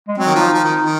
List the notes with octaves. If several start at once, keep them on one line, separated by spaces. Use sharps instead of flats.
G#3
F#3 C4
D#3
F3 D#4
F3
D#3
D#3